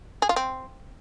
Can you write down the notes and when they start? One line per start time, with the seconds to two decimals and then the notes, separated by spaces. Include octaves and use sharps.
0.22 G#4
0.29 F4
0.36 C4